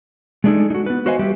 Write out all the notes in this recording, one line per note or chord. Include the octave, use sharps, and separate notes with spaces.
G#3 A3 D4 D#4 G#4 A4
D#4 F#4
B3 B4
F#4 B4 C5 D#5 F5 G#5
G3 A3 G4 B4 E5